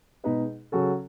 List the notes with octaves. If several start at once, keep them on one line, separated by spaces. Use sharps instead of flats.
B2 G#3 D#4 G#4 B4
C#3 F#3 C#4 F#4 A4